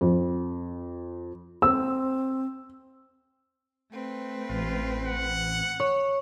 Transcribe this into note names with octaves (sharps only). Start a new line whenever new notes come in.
F2
C4 E6
A3 C4 B4
A1 F4
F#5
C#5